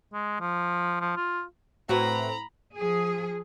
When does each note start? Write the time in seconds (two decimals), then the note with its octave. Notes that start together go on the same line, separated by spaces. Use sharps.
0.13 G#3
0.41 F3
1.01 F3
1.17 F4
1.89 A2 C4 F#4 B4 A#5 B5
2.76 F3 G#4